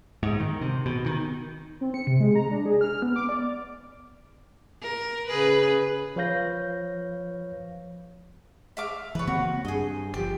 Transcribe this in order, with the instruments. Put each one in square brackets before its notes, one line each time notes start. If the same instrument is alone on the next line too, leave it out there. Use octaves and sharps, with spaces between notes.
[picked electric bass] G#2
D#3
C3
B2
D#3
[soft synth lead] C4
C#7
C3
G#3
A#5
D4
G#4
F6
B3
D6
D5
[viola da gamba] A#4
C#3 G#4 B4
[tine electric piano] F3 B4 C#5 F5 G6 A#6
[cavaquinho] E5 F5 D6
[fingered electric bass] E3 [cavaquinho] B4 C#5
[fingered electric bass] C#3 A#3 C4 [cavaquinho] F#4
[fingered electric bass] G2 [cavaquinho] G#4 D#5
[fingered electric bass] G1 F3 [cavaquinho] G4